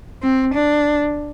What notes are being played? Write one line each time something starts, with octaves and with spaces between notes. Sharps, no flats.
C4
D4